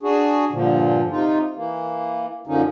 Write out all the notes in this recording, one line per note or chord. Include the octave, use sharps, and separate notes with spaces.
D4 F#4 G#4
G2 A#2 D3 F3
C3 D#4 F4
E3 A#3
F#2 D3 F3 A#3 C#4 D#4